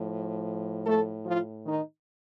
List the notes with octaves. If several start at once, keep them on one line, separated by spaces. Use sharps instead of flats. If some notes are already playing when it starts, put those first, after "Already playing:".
Already playing: A2 F3
A3 A4
F3 F4
D#3 D#4